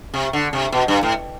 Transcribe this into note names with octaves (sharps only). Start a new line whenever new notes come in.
C3
D3
C3
B2
G2
A2